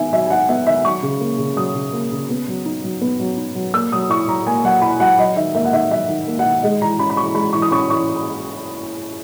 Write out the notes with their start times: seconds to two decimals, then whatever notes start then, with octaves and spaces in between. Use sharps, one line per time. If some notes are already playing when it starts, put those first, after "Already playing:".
Already playing: D#3 B3 D#4 E5 G#5
0.13 F#3 E5
0.26 G#5
0.30 D#4 F#5
0.49 B3 E5
0.67 D#3 E5
0.85 F#3 C#6
1.03 C#3
1.20 A#3
1.38 C#3
1.57 F#3 D#6
1.75 C#3
1.93 A#3
2.12 C#3
2.30 B3
2.48 F#3
2.66 D#4
2.84 F#3
3.01 B3
3.20 F#3
3.37 D#4
3.55 F#3
3.74 A#3 E6
3.92 F#3 D#6
4.10 E4 C#6
4.28 F#3 A#5
4.47 A#3 G#5
4.64 F#3 F#5
4.82 E4 B5
5.00 F#3 F#5
5.18 F#3 D#5
5.36 D#3 E5
5.55 A#3 E5
5.65 F#5
5.73 D#3 E5
5.91 F#3 E5
6.08 D#3
6.28 A#3
6.39 F#5
6.45 D#3
6.63 G#3 D#5
6.81 E3 A#5
6.99 C#4 B5
7.10 B5
7.17 E3 C#6
7.35 G#3 B5
7.53 E3 C#6
7.62 D#6
7.71 C#4 C#6
7.89 E3 C#6